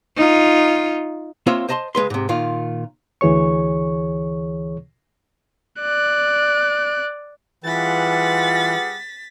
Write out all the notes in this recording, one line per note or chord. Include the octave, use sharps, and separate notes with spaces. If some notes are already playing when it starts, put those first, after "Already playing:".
D#4 F4
A#3 C4 F4 C5 C#5 E5
C5 D#5 A5 B5 C6
C#2 G#3 B4 C6
G#2 C3
A#2 D#3 F4
D2 E3 G#4 C#5 C#6
D5 F#6
E3 G3 F4 G#4 B4 F#5 A6 B6